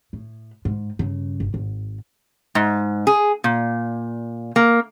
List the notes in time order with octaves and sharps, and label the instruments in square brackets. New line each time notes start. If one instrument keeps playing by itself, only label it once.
[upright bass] A2
G#2
G2 C#3
G1
G#1
[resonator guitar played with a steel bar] G#2
G#4
A#2
A#3